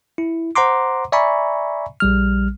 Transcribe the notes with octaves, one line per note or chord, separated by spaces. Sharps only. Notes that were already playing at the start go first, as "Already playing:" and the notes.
E4
C5 F#5 A#5 C6 D6
D5 E5 G#5 A#5 B5 C#6
A#1 G3 F6